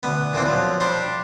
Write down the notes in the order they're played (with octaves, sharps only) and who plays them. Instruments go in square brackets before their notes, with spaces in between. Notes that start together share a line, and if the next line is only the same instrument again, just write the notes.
[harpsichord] D2 B3
A#2 D3 E3 C4
F3 F#3
G3 D4 C5